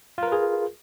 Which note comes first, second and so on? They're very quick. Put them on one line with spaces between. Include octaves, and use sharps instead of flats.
F4 A#4 B4 G#4